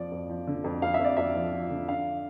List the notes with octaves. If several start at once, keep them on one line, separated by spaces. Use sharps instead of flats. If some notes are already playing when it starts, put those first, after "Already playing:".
Already playing: F2 F3 D5
F2
F3
D3
F2
F2 F5
E5
F2
D5
F2 E5
F3
F3
D3
D4 F5